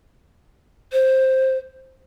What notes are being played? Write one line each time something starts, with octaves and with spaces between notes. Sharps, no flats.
C5